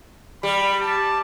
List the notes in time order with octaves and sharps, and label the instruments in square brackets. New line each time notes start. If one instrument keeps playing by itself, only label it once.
[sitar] G3 [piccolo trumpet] B5
[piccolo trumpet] A5